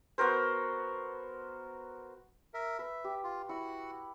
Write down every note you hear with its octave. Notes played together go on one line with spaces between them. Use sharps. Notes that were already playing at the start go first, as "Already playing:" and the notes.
B3 F#4 A#4 C5
A#4 E5
B4 E5
G4
F4
E4 F#4 F#5